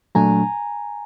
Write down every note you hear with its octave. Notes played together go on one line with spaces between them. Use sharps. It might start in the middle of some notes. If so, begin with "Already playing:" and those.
A#2 F#3 A3 D4 G#5 A#5